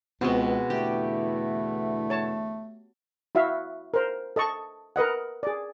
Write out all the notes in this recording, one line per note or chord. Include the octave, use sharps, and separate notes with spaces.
C#2 B2 G#3 B3 C4 F#4
E2 D3 A3 E4 G4
C#5 A5
E4 F#4 E5 F5
A#4 C5
A4 D#5 A5 C#6
A#4 B4 D#5 F#5
G#4 D5